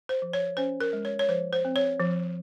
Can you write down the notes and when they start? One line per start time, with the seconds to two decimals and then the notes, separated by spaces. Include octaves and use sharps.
0.09 C5
0.22 F3
0.33 C#5
0.57 C#4 C5
0.81 A#4
0.93 G#3
1.05 C#5
1.19 C#5
1.29 F3 C5
1.53 C5
1.65 C4
1.76 C#5
2.00 F3